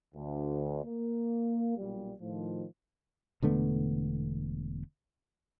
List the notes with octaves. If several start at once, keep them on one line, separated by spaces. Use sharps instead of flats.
D2
A#3
B1 A#2 G3
A2 D#3 F3
E1 D3 A3 B3